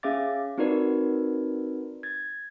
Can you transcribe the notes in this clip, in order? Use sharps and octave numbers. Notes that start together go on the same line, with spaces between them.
C#4 G#4 E5 F5 D6 A6
C4 D#4 F#4 A#4 B4 D5
G#6 A6